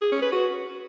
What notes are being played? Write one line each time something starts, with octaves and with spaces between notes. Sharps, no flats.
G#4
C#4
B4
F#4